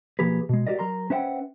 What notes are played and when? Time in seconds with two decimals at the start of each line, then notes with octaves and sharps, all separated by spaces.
0.19 B1 F3 A#3 G4 G#4 B4
0.49 B2 G#3
0.67 F#4 G4 A#4 D5 D#5
0.79 F#3 A#4 A#5 C6
1.10 C#4 B4 C5 E5 F#5 G5